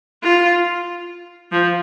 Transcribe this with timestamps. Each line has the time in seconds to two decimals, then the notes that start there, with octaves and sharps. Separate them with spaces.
0.22 F4
1.52 F3